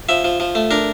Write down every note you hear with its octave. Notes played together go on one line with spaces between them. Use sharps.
F3 E5
F3
F3
A3
D4 A#4